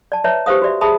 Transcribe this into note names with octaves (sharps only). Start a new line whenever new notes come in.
D5 A5
B4 C#5 D5 E5 A5 A#5
G4 B4 C5 F5 D#6
F#4 B4 D5 E5
G#4 E5 A5 B5 D#6